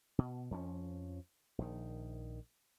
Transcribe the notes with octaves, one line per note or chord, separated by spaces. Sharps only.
B2
F2 F3 C#4
A#1 D#3